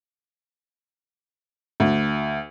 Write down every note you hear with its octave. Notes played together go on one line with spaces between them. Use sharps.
D2